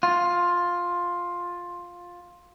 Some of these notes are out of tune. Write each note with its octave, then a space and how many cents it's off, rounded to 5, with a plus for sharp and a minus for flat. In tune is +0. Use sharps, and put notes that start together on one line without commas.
F4 +10